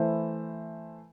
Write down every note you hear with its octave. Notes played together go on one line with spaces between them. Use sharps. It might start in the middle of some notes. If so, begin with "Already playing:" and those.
Already playing: E3 A3 E4 C5